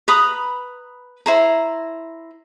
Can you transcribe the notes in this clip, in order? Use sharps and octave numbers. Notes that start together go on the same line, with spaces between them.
B4 A#5 B5 D#6
E4 C5 A#5